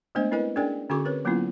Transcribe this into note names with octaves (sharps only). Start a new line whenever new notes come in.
G#3 A3 B3 D4 C5 D#5
C4 E4 A#4 B4 D#5 G#5
C#4 D4 G#4 A#4 D5 G5
D3 C#4 F#4 G#4 C#6 D6
C4 A#4 B4 C#5
F#3 A#3 B3 C#4 E4 F4